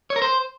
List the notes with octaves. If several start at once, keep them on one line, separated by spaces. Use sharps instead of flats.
C#5
A#4
C5